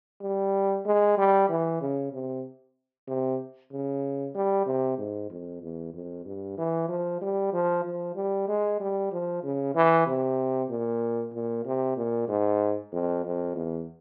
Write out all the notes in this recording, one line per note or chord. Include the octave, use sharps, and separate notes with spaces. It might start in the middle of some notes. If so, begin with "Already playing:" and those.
G3
G#3
G3
E3
C#3
C3
C3
C#3
G3
C3
G#2
F2
E2
F2
G2
E3
F3
G3
F3
F3
G3
G#3
G3
F3
C#3
E3
C3
A#2
A#2
C3
A#2
G#2
F2
F2
E2